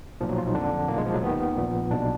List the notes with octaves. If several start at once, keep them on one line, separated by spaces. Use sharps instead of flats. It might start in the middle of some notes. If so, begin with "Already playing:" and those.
B1 A#2 F3
F#3
F4
D#4
F2 D3 D4
B1 A#2 A#3
G#3
F3
F#3
D#2 D#3 B3
A#1 A#2
B1 B2 D4